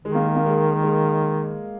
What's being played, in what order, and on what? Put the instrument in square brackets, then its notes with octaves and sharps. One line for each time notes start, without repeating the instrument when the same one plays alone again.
[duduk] D#3 [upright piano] G#3
[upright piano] A#3
G#3
A#3
G#3
G#3